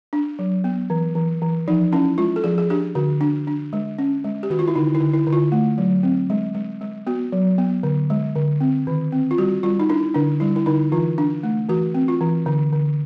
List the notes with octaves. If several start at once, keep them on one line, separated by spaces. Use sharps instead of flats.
D4
F#3
B3
E3
E3
E3
F3 D#4
C#4 E4
G#3 F4
A4
F3 G#4
G#4
D4 G4
D3 F#4
D4
D4
G#3
C#4
G#3
G4
D#3 F#4
F4
E4
D3 D#4
E4
D3
E4
D3
F4
A3
F#3
C4
G#3
G#3
G#3
B3 F#4
F#3
B3
D3
G#3
D3
C4
D#3
C4
F4
G3 F#4
G3 F4
D#4
D4 E4
D3 D4
G3 E4
E4
D3 D#4
E3 F4
D4
A3
E3 F#4
C4
F4
E3
D3
D3